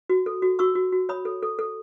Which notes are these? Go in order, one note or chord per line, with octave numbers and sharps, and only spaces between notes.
F#4
A4
F#4
F#4 C#6 E6
F#4
F#4
C#5 B5 D#6
A4
A4
A4